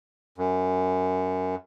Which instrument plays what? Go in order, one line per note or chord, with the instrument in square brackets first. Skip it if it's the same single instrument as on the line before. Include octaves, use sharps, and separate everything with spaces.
[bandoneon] F#2